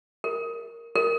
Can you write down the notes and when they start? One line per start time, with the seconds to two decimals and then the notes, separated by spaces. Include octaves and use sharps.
0.24 A#4
0.95 A#4